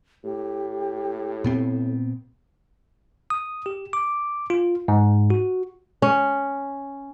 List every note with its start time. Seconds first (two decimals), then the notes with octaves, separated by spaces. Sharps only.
0.24 A2 G4
1.44 A#2 B3 C4
3.30 D#6
3.66 G4
3.93 D6
4.50 F4
4.88 G#2
5.30 F#4
6.02 C#4